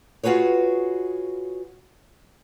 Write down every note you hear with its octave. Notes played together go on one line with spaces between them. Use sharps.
F4 F#4 G#4 B4 C#5